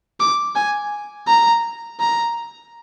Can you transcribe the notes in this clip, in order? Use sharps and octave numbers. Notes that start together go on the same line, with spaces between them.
D6
G#5
A#5
A#5